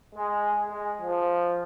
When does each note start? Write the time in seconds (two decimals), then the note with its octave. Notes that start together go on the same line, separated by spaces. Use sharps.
0.15 G#3
0.68 G#3
1.00 F3